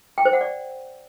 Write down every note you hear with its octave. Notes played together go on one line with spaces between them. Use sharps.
G5
C5
F#5
D5